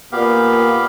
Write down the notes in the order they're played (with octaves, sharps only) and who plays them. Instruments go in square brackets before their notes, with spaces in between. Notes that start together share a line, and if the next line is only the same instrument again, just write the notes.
[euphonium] A#2 [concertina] B3 G4 F5